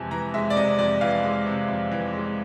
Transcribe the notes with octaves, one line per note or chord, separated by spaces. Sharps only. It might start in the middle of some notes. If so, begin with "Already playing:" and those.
Already playing: F2 C3 E3 G#3 G#5 A5
E3 A#5
G#3 E5
D5
C3 D#5
F2 D5
E3 F5
G#3
C3
F2
E3
G#3